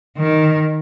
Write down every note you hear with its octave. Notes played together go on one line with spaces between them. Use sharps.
D#3